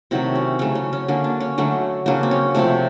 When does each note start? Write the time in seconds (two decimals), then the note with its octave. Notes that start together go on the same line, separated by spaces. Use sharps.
0.11 C3 D#3 F#3 A3 E4
0.35 C#4
0.59 C#3 F#3 A3 C#4
0.75 C#4
0.93 C#4
1.08 D3 F#3 A#3 C#4
1.24 D4
1.40 C#4
1.58 D3 F#3 A3
2.06 C#3 F#3 A#3 D4
2.23 C4
2.31 C#4
2.55 C3 F3 A3 C4